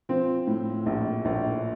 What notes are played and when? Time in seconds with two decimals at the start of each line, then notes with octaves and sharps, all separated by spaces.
0.09 F3 C4
0.47 A2
0.86 A#1
1.25 A#1